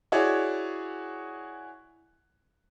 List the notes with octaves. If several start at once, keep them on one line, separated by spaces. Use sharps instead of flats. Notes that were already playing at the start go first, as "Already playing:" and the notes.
E4 F#4 G#4 C#5 D5